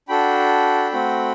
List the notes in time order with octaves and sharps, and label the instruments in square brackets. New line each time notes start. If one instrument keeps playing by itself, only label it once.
[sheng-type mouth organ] D4 F#4 A4 G5 B5
A3 C4 F#4